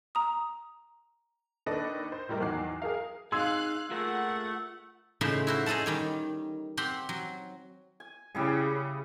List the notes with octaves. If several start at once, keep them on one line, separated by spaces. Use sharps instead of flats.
A#5 D#6
D#2 D4 A4 B4 D#5
C5
A2 G3 A#4 D#5
E2 D#3 F#3 D6 F#6 C7
G#4 A#4 F5
D#4 G#4 F5 C6 E6 F#6 G#6
A3 F4 G#4 A#4 F#5
A2 C#3 D#4 E4 C5 E5
E4 F#4 C5
D#4 G#4 A4 F#5 A5
D#3 G3 C#5
C4 G4 F#5 C6
F#3
G#5
C#3 G3 E4 G#4